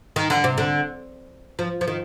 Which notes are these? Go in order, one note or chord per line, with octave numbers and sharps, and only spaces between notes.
D#3
D3
C3
D3
F3
F3
D#3